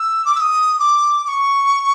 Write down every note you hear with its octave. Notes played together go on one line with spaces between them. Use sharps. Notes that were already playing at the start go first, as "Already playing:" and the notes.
Already playing: E6
D6
E6
D#6
D6
D6
C#6